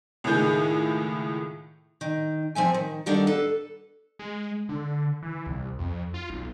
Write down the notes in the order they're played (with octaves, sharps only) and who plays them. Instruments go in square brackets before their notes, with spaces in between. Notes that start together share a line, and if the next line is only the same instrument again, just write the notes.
[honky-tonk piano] C#2 A2 D#3 G#4 G6
[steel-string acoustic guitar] D#3
F3 C4 E5 G#5
D#3
D#3 G3 D4 A4 F5 F#5
A4 B4
[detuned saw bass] G#3
D3
E3
C2
F2
F4
B1